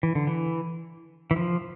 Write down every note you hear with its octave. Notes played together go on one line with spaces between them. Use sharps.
E3
D3
E3
E3
F3